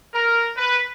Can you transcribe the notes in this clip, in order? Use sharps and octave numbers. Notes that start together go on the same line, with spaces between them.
A#4
B4